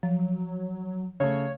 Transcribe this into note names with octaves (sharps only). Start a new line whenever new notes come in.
F3 F#3
C#3 A3 C#5